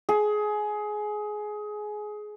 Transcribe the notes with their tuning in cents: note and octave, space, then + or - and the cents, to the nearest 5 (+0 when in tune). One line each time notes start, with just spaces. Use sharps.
G#4 +20